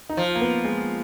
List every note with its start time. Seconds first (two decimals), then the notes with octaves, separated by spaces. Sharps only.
0.09 D#4
0.17 F3 F4
0.35 A#3
0.41 B3
0.65 G#3